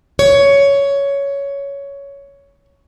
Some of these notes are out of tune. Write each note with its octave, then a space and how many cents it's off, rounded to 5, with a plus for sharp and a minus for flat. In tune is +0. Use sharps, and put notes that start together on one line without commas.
C#5 +10